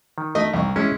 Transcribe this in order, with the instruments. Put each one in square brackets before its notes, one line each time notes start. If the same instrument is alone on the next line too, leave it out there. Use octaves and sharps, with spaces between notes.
[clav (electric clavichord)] D#3
[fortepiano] A3 D#5
C2 C#6
[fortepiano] G#3 [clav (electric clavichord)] C#4 E4